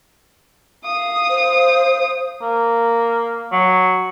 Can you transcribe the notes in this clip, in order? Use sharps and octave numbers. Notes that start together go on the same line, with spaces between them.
F5 D#6
C5
A#3
F#3